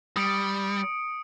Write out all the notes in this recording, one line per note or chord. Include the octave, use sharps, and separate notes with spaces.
G3 D#6 C#7 D7